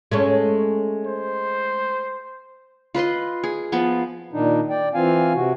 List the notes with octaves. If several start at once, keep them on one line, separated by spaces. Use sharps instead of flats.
G#3 A3 C#4
C5
F4 B4 D#5 C6
G#4
F3 B3 F4
A#2 D#3 D4 D#4
D5 G5
E3 C4 F4 F5 G#5
C3 F#4